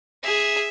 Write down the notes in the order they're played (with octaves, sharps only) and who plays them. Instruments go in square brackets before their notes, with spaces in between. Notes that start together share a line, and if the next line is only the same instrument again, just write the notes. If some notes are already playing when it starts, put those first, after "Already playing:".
[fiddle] G#4 [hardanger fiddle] E5